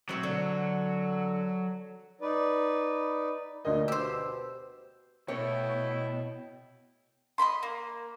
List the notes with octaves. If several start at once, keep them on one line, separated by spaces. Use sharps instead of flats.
F#3 C4 E5
D3
D#4 B4 D5
D2 A#2 D#5
B2 G4 C5 E6
B2 A3 E4 C#5 G5
D#5 G#5 B5 C6
A#3